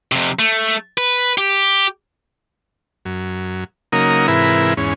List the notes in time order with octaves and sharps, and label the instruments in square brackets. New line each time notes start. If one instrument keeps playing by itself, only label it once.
[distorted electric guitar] F2 C3
A3
B4
G4
[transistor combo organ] F#2
C#3 F#3 A#3 D#4 A#4 D#6
G#2 C3 E3 E4 A#4 B4
E2 G#2 C#4